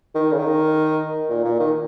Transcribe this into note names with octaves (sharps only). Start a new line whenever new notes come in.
D#3
C#3
D#3
A#2
A#2
D#3